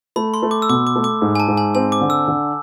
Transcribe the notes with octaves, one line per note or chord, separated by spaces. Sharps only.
A3 B5
C6
A3
D6
E6
B2 D6
D6
A3
D6
G#2
G#5
A5
G#2
G#5
C4 G#5
D6
D3
E6
D3